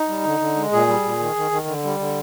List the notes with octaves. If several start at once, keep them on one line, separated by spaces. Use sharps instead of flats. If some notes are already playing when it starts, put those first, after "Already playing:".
Already playing: D#4
G3
D3
D3
G#3
A#2 G#4
G3
A#2
D#3
D#3
D#3
D3
G3
D3